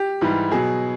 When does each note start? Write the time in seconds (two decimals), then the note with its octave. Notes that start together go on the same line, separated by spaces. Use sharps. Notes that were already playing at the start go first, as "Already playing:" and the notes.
Already playing: G4
0.21 G#2 E3 G3
0.51 B2 F#3 G#4